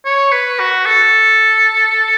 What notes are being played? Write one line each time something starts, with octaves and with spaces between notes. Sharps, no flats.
C#5
B4
F#4
A4